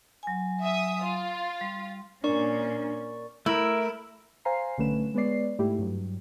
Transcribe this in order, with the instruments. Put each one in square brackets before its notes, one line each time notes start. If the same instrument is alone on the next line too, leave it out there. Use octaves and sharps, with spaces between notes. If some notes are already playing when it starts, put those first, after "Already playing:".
[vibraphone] F#3 G#5
[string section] E5 D#6
F4
[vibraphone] G3
[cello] A#2 C#4 [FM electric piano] D4 [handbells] A#4 D5 C#6
[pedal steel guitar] A3 A#4 [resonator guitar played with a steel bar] E4
[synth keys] C5 F5 G#5 A#5 C7
B1 D3 A3 C#4 B4 E7
G#3 B3 B4 C#5 D5 C7
G#2 A3 E4 G4
G2 F#3